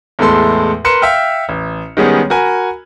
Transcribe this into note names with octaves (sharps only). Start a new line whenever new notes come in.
E2 A2 G#3 A4 C6
A#4 B4 C6 C#7 E7
E5 F5 G5 F6
A1
D#3 G3 G#3 B3 C#4 G#4
F#4 A#4 G#5 B5